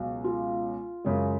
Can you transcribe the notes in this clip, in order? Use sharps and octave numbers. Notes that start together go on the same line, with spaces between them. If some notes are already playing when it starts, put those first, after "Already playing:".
Already playing: C#2 B2 F#3 F#4
F4
F#2 C#3 G#3